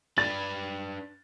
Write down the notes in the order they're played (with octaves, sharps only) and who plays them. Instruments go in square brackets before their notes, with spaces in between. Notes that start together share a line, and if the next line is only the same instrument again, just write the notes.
[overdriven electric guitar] D4 B4 [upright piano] A6